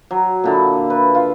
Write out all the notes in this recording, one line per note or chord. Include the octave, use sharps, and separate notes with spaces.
F#3
A#2 D3 E4
B4
F4